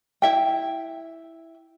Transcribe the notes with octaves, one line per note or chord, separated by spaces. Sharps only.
E4 E5 G5